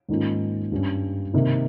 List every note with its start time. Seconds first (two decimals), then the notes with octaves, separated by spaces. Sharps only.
0.09 G#2 D#3 A#3 C#4 F4
0.72 G2 G3 C#4
1.34 C3 D#3 A#3